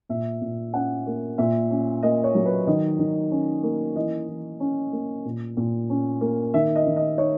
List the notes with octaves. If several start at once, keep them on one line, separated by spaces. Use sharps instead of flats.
A#2 E5
A#2
C#4 F#5
A#3
A#2 E5
C#4
A#3 D#5
C#5
F#3
B4
D#3 D#5
D#3
C#4
A#3
E3 D#5
E3
C#4
A#3
A#2
A#2
C#4
A#3
D#3 E5
D#5
D#3
D#5
D#4 C#5